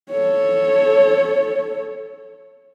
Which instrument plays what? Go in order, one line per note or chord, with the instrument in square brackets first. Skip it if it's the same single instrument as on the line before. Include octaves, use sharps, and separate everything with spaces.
[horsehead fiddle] A4 C#5